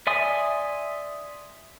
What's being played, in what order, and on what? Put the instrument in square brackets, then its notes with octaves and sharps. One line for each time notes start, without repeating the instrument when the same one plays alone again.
[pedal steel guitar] D5 E5 G#5 C6 D#6